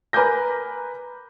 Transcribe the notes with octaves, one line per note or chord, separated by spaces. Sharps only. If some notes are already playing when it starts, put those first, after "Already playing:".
A#4 B4 G#5 D6 G6 A#6